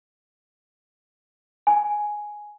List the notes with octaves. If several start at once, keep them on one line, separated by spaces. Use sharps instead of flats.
G#5